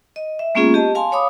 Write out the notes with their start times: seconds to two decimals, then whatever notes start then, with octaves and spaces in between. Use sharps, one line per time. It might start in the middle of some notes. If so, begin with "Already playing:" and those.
0.16 D#5
0.39 E5
0.55 G#3 A#3 B3 C#4 F4 G#4
0.74 G4 D#5 A5
0.95 F5 G#5 A5 C6
1.12 C#5 F5 B5 D6 D#6